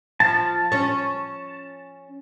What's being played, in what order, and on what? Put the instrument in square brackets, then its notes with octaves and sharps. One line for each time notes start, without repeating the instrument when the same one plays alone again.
[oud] F3 [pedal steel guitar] A5
[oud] C#4 C#5